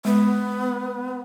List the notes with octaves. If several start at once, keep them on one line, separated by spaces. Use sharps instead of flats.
G#3 B3